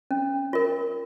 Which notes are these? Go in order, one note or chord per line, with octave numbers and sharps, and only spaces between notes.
C#4
F4 A#4